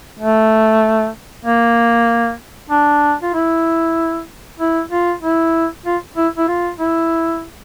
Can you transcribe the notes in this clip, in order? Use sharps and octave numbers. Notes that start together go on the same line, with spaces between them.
A3
A#3
D4
F4
E4
E4
F4
E4
F4
E4
E4
F4
E4